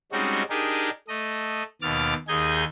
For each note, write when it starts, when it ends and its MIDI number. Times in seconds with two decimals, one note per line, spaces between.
0.12 0.42 55
0.12 0.42 56
0.12 0.42 60
0.12 0.42 61
0.12 0.42 63
0.12 0.42 66
0.50 0.90 62
0.50 0.90 63
0.50 0.90 67
0.50 0.90 68
0.50 0.90 70
1.08 1.63 57
1.08 1.63 75
1.82 2.14 39
1.82 2.14 47
1.82 2.14 86
1.82 2.14 89
1.82 2.14 93
2.28 2.64 39
2.28 2.64 63
2.28 2.64 68
2.28 2.64 91
2.28 2.64 92